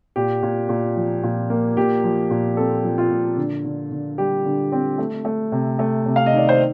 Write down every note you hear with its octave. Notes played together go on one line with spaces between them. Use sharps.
A#2 G4
A#2
A#2
F3
A#2
A#3
A#2 G4
F3
A#2
C4 A4
F3
F4
A#2
D3
D3
D3
G3 G4
D3
C4
A3
A3
C3
A3
C3
F5
D#5
D#3 D5
C5